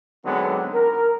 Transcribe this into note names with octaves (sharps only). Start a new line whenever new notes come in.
D3 F#3 G#3 B3 C4 D#4
A#4